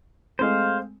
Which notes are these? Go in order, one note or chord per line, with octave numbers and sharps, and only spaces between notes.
G#3 A3 C4 C5 F5